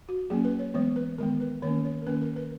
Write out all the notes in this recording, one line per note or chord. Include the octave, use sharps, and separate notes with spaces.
F#4
F#3 A#3 C#4 G#4
B4
C#5
E3 G#3 B3 C#5
B4
D#3 G#3 B3 A#4
B4
D#3 A#3 C#4 C#5
C#5
A#4
D#3 A#3 C#4 B4
A#4
B4